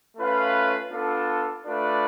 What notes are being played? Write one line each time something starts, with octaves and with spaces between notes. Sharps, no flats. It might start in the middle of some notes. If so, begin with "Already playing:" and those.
A3 C#4 F4 B4 F5
B3 D4 F4 A4
A3 D4 F4 B4 D5